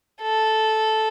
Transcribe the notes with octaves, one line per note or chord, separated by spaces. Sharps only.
A4